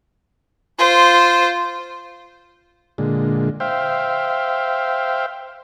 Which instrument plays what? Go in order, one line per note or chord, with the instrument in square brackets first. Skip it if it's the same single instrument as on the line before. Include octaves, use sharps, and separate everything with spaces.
[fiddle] F4 C5
[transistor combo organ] A#2 D3 G#3
C5 E5 F5 G5